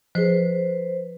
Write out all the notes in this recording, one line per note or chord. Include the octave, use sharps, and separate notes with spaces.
F3 G#4 B4 C5